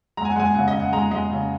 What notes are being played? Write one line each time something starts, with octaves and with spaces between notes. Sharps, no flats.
G#3 A#5
G#5
F#5
G#3 G#5
C#3 F#5
D#5
C#3
F#5
G#3 A#5
G#3 D#5
C#3